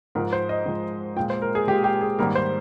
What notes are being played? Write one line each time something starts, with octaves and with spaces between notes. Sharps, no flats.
G#2 F3 G#3 A#4
C5
D#5
G#2 F3 G#3
A#2 G#3 G5
C5
A#4
G#4
A#2 G#3 G4
G4
G#4
G#2 D#3 G3 A#3 A#4
C5